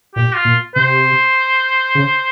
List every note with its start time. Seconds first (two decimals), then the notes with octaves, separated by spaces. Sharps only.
0.15 A#2 G4
0.36 F4
0.45 A#2
0.75 C3 C5
1.95 C#3